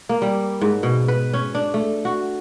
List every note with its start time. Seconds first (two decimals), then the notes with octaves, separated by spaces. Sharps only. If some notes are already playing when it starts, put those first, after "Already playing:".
0.09 A#3
0.22 G3
0.61 G#2
0.83 B2
1.08 B4
1.33 C#4
1.55 D4
1.74 A3
2.05 F#4